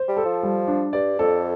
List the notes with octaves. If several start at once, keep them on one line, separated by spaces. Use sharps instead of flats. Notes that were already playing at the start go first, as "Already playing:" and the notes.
Already playing: C5
G3
A4
F3
G3
D4
G2 D5
F2 A4